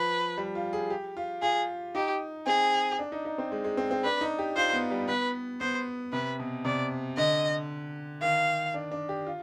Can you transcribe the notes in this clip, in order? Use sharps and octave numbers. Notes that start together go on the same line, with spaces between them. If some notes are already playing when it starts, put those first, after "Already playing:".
Already playing: F3 B4
G3
F4
G#4
G4
F4
F4 G#4
D#4 G4
C4 G#4
D4
D#4
D#4
C4
G#3
G#3
C4
C4
D4 B4
D#4
G4
F4 C5
B3
G3
B3 B4
B3 C5
C3 B4
B2
C3 D5
D3 D#5
D#3 F5
D4
D4
G4
F4